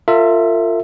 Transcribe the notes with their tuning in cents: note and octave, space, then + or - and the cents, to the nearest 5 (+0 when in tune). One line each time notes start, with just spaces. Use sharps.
F4 +0 A#4 -45 E5 +0